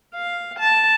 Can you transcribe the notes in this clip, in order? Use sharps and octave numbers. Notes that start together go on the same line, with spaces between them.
F5
A5